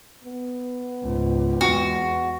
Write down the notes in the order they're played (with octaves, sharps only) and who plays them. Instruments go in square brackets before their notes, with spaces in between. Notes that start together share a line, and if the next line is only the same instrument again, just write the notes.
[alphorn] B3
[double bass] C#2 G#2
[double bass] E2 G#3 [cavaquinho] F#4